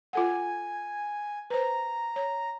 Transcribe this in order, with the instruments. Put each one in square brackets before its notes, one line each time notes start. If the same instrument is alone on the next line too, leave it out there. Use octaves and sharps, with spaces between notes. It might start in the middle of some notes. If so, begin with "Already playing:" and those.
[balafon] F4 A4 F#5 [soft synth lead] G#5
[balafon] B4 C5 [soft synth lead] A#5
[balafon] C#5